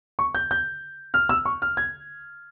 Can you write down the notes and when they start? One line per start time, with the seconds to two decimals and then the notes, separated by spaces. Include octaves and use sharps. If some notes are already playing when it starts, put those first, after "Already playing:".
0.19 C#6
0.35 G6
0.51 G6
1.14 F6
1.29 E6
1.45 C#6
1.62 F6
1.77 G#6